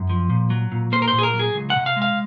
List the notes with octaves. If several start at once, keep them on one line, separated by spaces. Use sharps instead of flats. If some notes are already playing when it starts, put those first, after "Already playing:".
Already playing: F#2
F3
A#2
F#3
A#2
A#3 C5
A#4
A#2 C5
G#4
A#4
F#3
G#4
C#2
F#5
C3
F5
G#3
F5